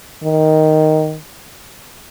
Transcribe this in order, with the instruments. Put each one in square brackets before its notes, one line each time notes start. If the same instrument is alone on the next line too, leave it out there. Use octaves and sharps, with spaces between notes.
[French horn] D#3